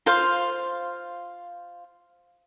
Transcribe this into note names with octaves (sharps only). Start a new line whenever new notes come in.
F4 C5 F5